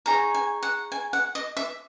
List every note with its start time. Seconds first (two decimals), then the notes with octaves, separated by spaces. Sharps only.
0.06 D#4 G#4 C#5 A#5
0.35 G#5
0.63 F#5
0.92 G#5
1.13 F#5
1.35 D#5
1.57 E5